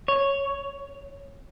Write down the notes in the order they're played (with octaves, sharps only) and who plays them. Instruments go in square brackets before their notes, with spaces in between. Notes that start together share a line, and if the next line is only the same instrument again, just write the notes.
[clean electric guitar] C#5